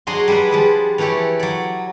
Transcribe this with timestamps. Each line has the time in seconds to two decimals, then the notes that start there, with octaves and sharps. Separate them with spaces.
0.07 F#3 D4 G#4 D#5 C6
0.28 G3 G#3 D4 G#4 B4
0.51 F3 G3 G#4
0.98 E3 A3 E4 G4 C#5
1.39 F#3 D5